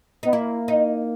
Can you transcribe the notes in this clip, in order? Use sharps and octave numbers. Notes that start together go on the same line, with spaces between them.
B3 D#4
A#3 E4
D#4